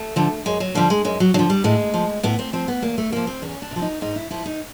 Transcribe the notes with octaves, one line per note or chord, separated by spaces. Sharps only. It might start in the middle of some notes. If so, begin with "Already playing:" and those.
Already playing: A3
D3 F3
F#2 G#3
F#3
D3 F3 G3
G#3
F#2 G#3
F#3
D3 F3 F#3
G3
A2 G#3
F3
A2 B3
C4
F3 C4
B3
E2 A#3
A3
C3 F3 A#3
C4
E2 C#4
D4
C3 F3
D#4
G#2 D#4
E4
F3 E4
D#4